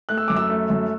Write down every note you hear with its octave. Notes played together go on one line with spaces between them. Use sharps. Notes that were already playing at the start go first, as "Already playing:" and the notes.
A3 F#6
E6
F#2 D6
E6
A3
F#2